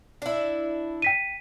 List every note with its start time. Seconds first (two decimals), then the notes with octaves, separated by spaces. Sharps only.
0.22 D4 E4
1.02 G5 B6 D#7